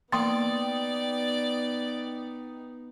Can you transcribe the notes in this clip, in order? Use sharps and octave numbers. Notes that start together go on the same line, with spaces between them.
A#3 B3 D#4 D5 G5 C6 D#6 A6